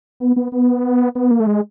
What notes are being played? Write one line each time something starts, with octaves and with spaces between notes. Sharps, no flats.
B3
B3
B3
B3
A#3
A3
G#3